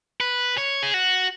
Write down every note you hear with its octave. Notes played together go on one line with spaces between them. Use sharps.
B4
C#5
G#4
F#4